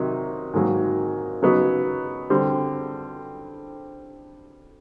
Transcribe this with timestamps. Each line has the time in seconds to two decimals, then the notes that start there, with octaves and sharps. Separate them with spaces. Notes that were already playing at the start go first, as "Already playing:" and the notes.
Already playing: C3 D#3 F#3 D#4
0.53 G#2 D#3 F#3 A#3
1.42 C#3 F#3 B3 D#4 F#4
2.30 D3 G3 C4